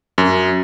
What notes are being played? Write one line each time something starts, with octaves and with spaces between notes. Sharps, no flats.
F#2